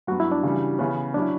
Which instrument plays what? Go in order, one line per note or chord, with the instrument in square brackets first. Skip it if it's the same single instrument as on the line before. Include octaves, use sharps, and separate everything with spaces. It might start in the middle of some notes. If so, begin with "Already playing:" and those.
[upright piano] G2 F#3 B3 [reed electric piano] F#4
[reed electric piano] E4
D4
[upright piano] C#3 E3 G3
[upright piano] C#3 E3 B3 [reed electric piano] C#4
[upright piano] F#3 C#4 E4 [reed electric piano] D4